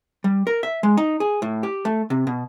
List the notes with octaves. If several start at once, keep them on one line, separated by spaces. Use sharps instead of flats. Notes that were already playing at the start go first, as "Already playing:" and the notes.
G3
A#4
E5
G#3
D#4
G#4
A2
G4
A3
C3
B2